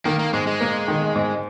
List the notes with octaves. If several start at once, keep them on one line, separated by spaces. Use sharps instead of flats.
D#3 A#3
A#3
G#2 G#3
G#3
A#3
D#3
G#2